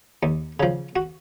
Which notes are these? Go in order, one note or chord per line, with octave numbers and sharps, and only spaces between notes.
D#2
C#3 F3
F#4